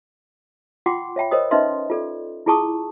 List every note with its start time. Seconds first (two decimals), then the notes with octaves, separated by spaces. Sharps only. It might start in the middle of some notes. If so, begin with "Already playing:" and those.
0.86 F4 F#5 G5 C6 D6
1.16 C#5 E5 G5 B5
1.31 A#4 C5 C#5 D#5 D#6
1.51 C#4 D#4 B4 D#5 E5 C6
1.90 F4 A4 D5
2.46 E4 F4 G#4 A5 C#6 D#6